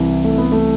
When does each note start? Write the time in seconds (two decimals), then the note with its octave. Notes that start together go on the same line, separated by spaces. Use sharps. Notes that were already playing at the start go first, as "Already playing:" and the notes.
Already playing: C2 C3 E3
0.24 A3
0.38 B3
0.52 A3